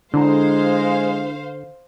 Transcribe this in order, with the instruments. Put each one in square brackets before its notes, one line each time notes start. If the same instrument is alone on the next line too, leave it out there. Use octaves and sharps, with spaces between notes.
[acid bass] D3 [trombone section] G#3 [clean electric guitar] D4 E4 A#5 [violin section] C5 F5